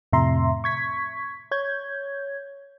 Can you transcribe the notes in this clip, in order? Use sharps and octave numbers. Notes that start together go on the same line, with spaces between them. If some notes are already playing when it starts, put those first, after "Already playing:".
F2 A2 C3 E5 A#5 C6
C#6 G#6 B6
C#5 G6 G#6